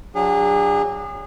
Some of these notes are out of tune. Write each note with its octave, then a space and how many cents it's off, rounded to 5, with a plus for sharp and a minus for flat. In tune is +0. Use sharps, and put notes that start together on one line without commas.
F#3 +0 D4 +0 G#4 -35